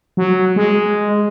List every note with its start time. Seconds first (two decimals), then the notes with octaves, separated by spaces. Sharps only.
0.17 F#3
0.56 G#3